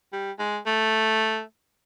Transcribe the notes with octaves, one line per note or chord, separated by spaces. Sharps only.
G3
G#3
A3